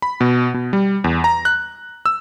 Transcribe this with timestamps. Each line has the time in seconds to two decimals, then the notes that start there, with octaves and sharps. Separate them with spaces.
0.02 B5
0.21 B2
0.54 B2
0.73 G3
1.04 E2
1.24 A#5
1.45 F#6
2.06 E6